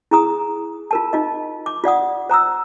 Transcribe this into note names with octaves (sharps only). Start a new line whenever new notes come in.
E4 G#4 A#5 D#6
F4 A#4 A5
D#4 F4 D#5
D6
F4 D5 F#5 D#6
C5 A#5 D#6 E6